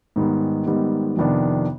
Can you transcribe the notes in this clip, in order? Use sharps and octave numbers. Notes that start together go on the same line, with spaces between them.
G#2 D#3 G3 B3
G#2 D#3 G3 B3
F2 C3 D#3 B3 D4